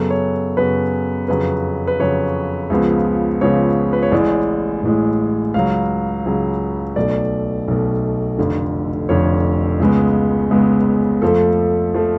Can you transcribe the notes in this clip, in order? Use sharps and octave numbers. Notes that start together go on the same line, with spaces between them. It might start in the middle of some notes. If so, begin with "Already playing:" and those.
Already playing: F#2 C#3 F#3 B3 A4
C#5
F#2 C#3 F#3 B3 B4
F2 C#3 F#3 B4
B4
F2 C#3 F#3 C#5
C#2 C#3 F3 B3
C#2 C#3 F3 B3 C#5
B4
C#5
A1 A2 G#3 D5
A1 A2 G#3
C#2 C#3 F#3 F5
C#2 C#3 F#3
B1 B2 A3 D5
B1 B2 A3
F1 F2 D3
F1 F2 D3 C#5
C#2 C#3 G#3 B3
C#2 C#3 G#3 B3
F2 F3 A3 A4
F3 A3